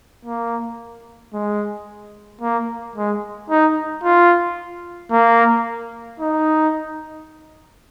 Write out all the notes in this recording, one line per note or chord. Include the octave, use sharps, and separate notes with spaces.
A#3
G#3
A#3
G#3
D#4
F4
A#3
D#4